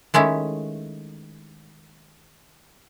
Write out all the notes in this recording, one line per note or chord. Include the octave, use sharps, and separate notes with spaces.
D#3 G#3 A3 C#4 E4